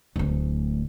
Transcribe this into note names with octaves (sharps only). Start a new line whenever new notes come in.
D1 D2